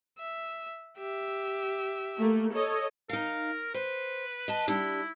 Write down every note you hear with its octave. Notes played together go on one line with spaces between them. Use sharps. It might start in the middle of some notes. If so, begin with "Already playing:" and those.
E5
G4 E5
A3 A#3
A4 C#5 D#5
D#4 A#4 F5
B4 C5
D#5 A5
G3 D4 E4